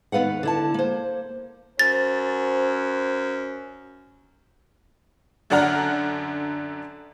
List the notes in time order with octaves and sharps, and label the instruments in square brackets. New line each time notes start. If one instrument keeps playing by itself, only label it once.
[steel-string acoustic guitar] D#2 B3 B4 F5 F#5
D3 E4 A5
A#3 C5
[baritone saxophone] F#2 [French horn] C5 [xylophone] A6
[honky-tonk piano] F#2 D3 D4 F#5 A#5 F6